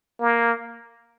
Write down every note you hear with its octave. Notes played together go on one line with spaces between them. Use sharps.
A#3